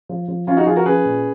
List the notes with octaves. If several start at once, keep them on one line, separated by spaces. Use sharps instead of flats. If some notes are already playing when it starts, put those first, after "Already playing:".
F3
F3
F3 C#4 F4
D#4 F#4
F3 F4 G#4
F#4 A#4
C#4 G#4 B4
A#2